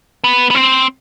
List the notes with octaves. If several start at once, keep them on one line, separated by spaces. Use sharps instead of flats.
B3
B3
C4